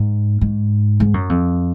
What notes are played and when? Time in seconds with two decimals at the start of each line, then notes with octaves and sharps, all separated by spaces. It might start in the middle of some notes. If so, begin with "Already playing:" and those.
Already playing: G#2
0.41 G#2
1.00 G#2
1.14 F#2
1.29 F2